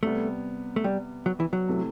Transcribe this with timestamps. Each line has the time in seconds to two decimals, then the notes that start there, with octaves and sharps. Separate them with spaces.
0.03 C3 G3 A3 B3
0.76 A3
0.84 G3
1.26 F#3
1.40 E3
1.53 F#3
1.68 C3 E3 A3